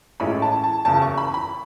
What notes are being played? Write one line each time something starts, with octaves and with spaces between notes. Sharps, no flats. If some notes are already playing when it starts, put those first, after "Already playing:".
A1 A2 E3 G#3 C#4 B5
A5
A5
F#1 E2 C#3 A5
C#6
B5
B5